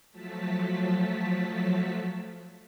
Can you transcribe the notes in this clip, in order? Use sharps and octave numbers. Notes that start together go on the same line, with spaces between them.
F3 F#3 A3 A5 B6